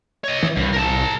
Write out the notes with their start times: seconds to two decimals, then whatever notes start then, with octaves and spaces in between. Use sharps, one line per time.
0.24 C#5 D#5
0.43 E3
0.57 C2 G2
0.73 A#4 A5